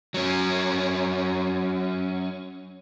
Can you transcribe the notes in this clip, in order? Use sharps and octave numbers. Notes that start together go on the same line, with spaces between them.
F#3 C#4